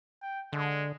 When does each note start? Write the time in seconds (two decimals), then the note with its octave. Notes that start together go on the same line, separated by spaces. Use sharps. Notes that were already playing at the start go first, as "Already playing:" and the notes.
0.22 G5
0.53 D3 G#3